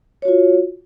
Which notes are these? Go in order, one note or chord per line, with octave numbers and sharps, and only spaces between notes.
F4 F#4 C#5